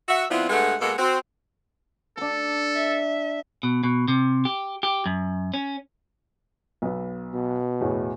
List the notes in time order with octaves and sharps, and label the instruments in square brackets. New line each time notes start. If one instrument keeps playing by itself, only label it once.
[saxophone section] F#4 E5 F#5
F3 B3 C4 D4 E4 F4
G2 G#3 A3 B3 F#5
B2 G#3 A#3 A4 F#5
C4 F#4
[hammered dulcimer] D4 A5 [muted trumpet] A4
[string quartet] E5
[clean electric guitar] B2
B2
C3
G4
G4
F#2
C#4
[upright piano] B1 B3
[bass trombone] B2
[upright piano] E2 A2